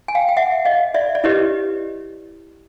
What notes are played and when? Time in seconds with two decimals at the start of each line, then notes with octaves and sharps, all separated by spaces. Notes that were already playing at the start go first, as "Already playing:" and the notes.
0.08 G#5
0.15 F5 G5
0.29 G5
0.37 E5 F#5
0.65 D#5 F5
0.94 D5 E5
1.15 D5
1.24 E4 G4 B4 C#5 D#5